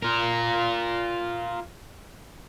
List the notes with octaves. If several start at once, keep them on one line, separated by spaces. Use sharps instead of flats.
F4 A#4